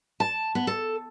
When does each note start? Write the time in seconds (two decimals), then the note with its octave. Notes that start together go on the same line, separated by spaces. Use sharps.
0.20 A5
0.55 B3
0.67 A4